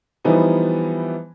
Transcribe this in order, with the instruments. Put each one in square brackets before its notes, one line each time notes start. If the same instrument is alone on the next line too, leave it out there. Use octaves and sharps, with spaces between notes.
[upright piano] E3 F3 G3 B3 D#4